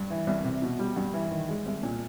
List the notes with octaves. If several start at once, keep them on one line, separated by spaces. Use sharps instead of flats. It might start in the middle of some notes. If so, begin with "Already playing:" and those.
Already playing: G2
E3
C2
C3
B2
G3
G2
E3
D#3
G#3
C2
A#2